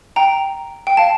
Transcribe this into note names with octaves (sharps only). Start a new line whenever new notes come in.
G5 A#5
G5
F5 A5